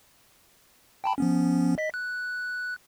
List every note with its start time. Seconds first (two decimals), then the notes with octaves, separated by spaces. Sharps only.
1.04 G5 A5 B5
1.18 F3 B3 C#4
1.78 D#5 B6
1.94 F#6